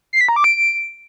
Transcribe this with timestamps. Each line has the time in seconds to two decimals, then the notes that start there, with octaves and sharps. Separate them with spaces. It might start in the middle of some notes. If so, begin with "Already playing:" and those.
0.13 C7
0.21 B6
0.29 A#5
0.36 D6
0.44 D7